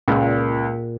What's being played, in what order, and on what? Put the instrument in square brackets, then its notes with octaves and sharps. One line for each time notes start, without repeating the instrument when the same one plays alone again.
[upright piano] C#2 [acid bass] A#2